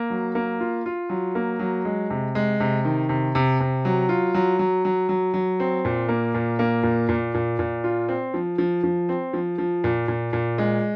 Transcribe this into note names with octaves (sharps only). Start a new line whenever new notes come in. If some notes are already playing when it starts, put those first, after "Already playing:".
Already playing: A#3
F#3
A#3
F4
F4
F#3
A#3
F#3
G#3
C3
G#3
C3
D#3
C3
C3
C3
F#3
F4
F#3
F#3
F#3
F#3
F#3
C4
A#2
A#3
A#2
A#3
A#2
A#2
A#2
A#2
F4
C4
F3
F3
F3
C4
F3
F3
A#2
A#2
A#2
G#3